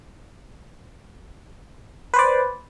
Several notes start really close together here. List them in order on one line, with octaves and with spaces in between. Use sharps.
B4 C5 D5